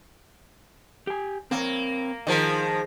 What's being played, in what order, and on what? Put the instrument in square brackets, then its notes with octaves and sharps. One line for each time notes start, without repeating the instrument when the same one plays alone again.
[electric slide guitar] G4 G#5
[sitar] A#3 [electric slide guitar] C4 A#4 C#5
[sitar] D#3 F3 A#4 [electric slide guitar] G#4 C5 D#5